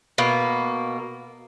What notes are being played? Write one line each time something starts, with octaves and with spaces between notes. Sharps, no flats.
B2 A#3